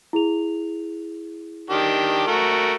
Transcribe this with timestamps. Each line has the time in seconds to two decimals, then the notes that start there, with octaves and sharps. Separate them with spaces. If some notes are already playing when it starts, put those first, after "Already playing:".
0.13 E4 G#4 F7
1.70 D#3 D4 G4
2.27 A3 F#4 A#4